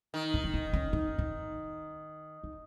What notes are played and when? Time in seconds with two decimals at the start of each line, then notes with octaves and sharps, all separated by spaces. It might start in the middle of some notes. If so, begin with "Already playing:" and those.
0.14 D#3
0.34 D#4
0.44 D#4
0.54 C#4
0.73 C#4
0.93 D#4
1.18 D#4
2.43 D#4